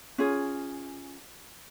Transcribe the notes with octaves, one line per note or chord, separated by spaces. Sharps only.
C#4 F4 G#4